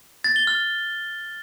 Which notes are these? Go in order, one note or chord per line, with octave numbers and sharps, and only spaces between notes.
A6
G7
F6